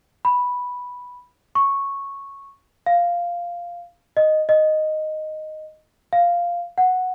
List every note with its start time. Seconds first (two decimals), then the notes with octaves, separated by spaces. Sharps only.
0.25 B5
1.55 C#6
2.86 F5
4.17 D#5
4.49 D#5
6.13 F5
6.78 F#5